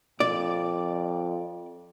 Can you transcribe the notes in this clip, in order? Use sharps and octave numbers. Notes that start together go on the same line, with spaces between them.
F2 D5